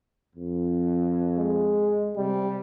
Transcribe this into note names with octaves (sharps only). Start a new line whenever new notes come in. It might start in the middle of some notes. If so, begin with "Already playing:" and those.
F2
G#3
C3 G3